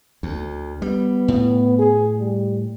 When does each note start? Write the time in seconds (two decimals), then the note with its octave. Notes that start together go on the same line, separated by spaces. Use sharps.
0.23 D2
0.82 G3 B3
1.28 A2
1.79 G#4
2.19 G3